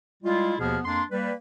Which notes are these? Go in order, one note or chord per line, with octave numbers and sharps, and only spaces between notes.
G3 G#3 E4 F4
D#2 B2 F3 B3 G#4 F6
F2 A#3 D4 C6
G3 A#3 B4